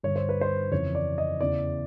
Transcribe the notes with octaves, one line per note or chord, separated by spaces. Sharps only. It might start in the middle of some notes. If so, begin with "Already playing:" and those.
G2 D3 C#5
C5
B4
C5
F2 C#3 E3 C#5
D5
D#5
E2 C#3 E3 D5